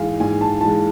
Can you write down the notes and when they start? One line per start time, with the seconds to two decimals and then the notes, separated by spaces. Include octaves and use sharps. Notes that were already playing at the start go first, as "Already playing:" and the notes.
Already playing: G#2 E3 G#3 F5 G#5
0.20 G#2 G#5
0.41 A5
0.61 E3 G#3 A5